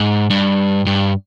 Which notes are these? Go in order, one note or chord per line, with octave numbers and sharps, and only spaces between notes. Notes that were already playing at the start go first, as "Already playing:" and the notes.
Already playing: G#2
G2
G2